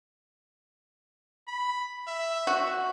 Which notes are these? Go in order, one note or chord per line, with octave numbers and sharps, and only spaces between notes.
B5
E5
F#4